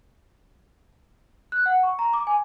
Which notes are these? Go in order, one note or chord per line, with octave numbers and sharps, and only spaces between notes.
F#6
F#5
C#6
A#5
D6
G#5